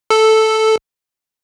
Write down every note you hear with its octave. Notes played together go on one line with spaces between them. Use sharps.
A4